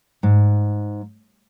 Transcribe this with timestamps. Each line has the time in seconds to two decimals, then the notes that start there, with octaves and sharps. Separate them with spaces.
0.23 G#2